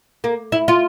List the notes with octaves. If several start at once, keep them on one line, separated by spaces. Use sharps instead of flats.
A#3
E4
F4